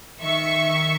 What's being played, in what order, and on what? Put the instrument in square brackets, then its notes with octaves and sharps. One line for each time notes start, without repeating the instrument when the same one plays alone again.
[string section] D#3 E5 C#6